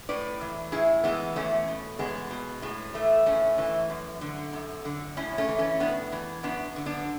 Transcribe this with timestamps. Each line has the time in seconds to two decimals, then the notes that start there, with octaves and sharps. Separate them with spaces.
0.09 A2 B4 D5
0.41 E3
0.72 A2 E4 G#4
1.04 E3 G#3 B3
1.36 E2 A3 C#4
1.68 B2
1.99 E2 G#3 B3
2.31 B2
2.62 A2 G#3
2.94 E3 A3
3.26 A2 A3 C#4
3.58 E3
3.90 F#2
4.21 D3
4.53 F#2
4.85 D3
5.17 A2 C#4 E4
5.38 A3 C#4
5.48 E3
5.58 A3 C#4
5.80 A2 B3 D4
6.12 E3
6.43 F#2 B3 D4
6.76 D3
6.86 B3 D4